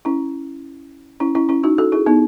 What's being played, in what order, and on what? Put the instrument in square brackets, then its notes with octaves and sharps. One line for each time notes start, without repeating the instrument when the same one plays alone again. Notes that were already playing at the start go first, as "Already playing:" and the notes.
[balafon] C#4 E4
C#4 E4
C#4 E4
C#4 E4
D#4 F#4
F#4 A4
E4 G#4
B3 D#4